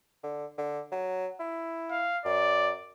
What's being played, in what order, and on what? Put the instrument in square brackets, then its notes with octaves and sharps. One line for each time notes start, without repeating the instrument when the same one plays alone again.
[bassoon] D3
D3
F#3
E4
[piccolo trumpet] F5
[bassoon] F#2 [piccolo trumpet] D5